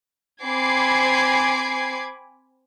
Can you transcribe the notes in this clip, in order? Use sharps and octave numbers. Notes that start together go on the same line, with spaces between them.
C4 G#5 B5 D6 G#6 C7